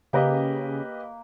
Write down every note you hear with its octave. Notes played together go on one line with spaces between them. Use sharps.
C#3 A#3 G4 B4 D#5